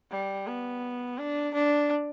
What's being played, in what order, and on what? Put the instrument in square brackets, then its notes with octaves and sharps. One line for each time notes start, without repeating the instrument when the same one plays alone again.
[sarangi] G3
B3
D4
D4